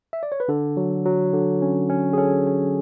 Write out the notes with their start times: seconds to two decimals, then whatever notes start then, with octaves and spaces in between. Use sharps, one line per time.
0.13 E5
0.23 D5
0.32 C#5
0.40 B4
0.48 D3 A4
0.77 F#3
1.06 F#3
1.33 D3
1.62 C#4
1.90 C#4
2.13 G#4
2.18 C#4 A4
2.47 C#4